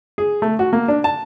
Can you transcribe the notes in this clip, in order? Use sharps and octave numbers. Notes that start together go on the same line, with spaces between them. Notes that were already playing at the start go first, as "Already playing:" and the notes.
G#4
A3
F#4
A#3
D4
A5